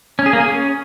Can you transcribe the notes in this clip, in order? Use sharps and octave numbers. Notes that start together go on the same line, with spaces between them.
C#4
G#4
A#3
G#4
C#4